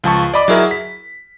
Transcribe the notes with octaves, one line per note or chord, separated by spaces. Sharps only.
C#2 F3 A5 C#6
D5 D#5 B5 D6
F#3 E4 G#4 A#4 E5
B6